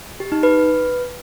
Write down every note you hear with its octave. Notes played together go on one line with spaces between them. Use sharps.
G4
D#4
B4